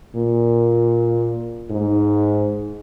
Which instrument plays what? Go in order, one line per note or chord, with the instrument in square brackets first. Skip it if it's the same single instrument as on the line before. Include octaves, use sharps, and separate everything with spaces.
[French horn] A#2
G#2